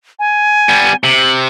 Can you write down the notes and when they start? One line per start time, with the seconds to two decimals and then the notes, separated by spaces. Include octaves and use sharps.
0.19 G#5
0.69 G3 B3
1.04 C3 F#7